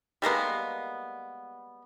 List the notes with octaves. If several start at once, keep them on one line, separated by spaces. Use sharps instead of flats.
G3 G#3 A#3 B3